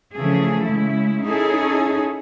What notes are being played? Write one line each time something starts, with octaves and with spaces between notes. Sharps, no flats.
C#3 E3 F3 A3 G#4 A4
C#3 G#3 A3 E4
C#4 D#4 E4 G#4 A4 C#5